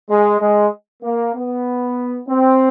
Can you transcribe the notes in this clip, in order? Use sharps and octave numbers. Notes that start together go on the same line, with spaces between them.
G#3
G#3
A#3
B3
C4